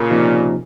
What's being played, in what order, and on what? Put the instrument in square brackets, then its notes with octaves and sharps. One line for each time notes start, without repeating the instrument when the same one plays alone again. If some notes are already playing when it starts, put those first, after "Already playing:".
Already playing: [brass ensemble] A#2 C#3
[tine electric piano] C3 F3 A#3 D#4